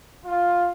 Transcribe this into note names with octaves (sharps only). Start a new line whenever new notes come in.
F4